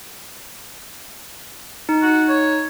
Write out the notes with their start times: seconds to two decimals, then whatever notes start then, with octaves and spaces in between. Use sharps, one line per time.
1.89 D#4
2.02 F#4
2.29 C#5